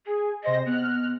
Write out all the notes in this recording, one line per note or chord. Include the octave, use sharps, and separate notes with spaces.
G#4 G#5
C3 C5 D#5 A#6
B3 F6 F#6